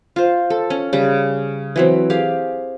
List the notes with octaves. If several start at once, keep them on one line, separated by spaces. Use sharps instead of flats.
F4 C5
A4
C#4
C#3 G3
E3 F#3 C4
G4 G#4 F5